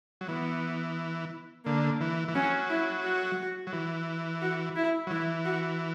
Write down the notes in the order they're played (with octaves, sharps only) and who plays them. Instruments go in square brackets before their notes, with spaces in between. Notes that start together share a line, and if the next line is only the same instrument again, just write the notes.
[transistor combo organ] F#3
[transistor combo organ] E3 [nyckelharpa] B3
[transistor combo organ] D3 [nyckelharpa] A#3
[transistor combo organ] E3
E3
[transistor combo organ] F#3 [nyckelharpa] C#4
[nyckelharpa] E4
F#4
[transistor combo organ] F#3
E3
[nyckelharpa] F#4
E4
[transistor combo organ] F#3
[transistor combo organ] E3 [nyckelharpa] E4
[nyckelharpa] F#4